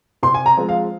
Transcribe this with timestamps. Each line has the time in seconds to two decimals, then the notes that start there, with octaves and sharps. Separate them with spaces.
0.23 C3 C6
0.34 G#5
0.46 A#5
0.57 F3 G#3 C4
0.69 F5